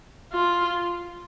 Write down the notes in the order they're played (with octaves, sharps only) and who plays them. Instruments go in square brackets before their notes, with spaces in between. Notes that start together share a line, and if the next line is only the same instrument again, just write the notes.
[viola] F4